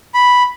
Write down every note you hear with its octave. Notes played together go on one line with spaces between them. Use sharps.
B5